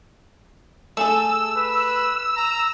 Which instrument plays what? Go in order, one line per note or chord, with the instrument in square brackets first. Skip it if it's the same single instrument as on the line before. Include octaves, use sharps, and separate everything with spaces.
[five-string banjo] A3 G#4 A4 [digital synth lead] E6
[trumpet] B4
A#5